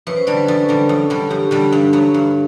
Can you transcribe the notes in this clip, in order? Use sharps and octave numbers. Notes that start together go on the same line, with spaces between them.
F#2 B4
C5
D3 G3 D5
B4
F#2 A4
D3 G3
F#2
D3 G3
F#2 G4
D3 G3
G2
F#3 B3
G2